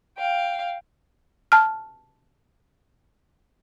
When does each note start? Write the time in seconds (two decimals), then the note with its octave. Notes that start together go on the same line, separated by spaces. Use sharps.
0.17 F5 G5
1.52 A5 F6